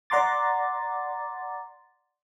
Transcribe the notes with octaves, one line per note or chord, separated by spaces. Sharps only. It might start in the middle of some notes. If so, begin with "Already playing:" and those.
D5 F#5 A#5 C6 D6 A6